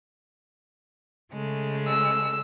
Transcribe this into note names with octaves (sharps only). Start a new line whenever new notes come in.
C#3 G#3 A3
E6